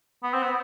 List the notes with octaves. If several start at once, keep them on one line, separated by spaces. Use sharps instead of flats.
B3
C4
B3